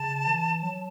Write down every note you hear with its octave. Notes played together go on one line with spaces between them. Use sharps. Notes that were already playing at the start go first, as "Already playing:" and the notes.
Already playing: C#3 A5
E3
F#3